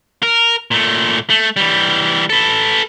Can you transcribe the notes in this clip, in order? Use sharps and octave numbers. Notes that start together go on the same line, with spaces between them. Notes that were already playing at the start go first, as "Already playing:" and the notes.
A#4
A#2 A3
A3
E3 G3
A4 B4